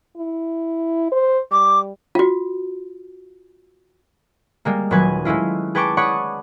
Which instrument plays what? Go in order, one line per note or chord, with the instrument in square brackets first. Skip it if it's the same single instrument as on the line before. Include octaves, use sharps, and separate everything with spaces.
[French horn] E4
C5
[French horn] G3 [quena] D6
[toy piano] F4 F#4
[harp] G3 G#3 A#3
D#1 F#3 B4 G#5
G#3 A3 C#4 E4 F4
G#4 B4 G5 A5 C#6 D6
C#5 D5 F#5 B5 C#6 D#6